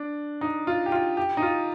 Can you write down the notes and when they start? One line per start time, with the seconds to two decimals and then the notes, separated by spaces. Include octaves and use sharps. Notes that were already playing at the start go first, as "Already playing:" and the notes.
Already playing: D4
0.41 D#4
0.67 F4
0.86 G4
0.92 F4
1.17 G4
1.37 D#4
1.42 F4